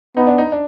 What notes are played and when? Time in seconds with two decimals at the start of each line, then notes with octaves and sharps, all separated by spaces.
0.17 B3 D#4
0.27 D4
0.38 D#4
0.52 D4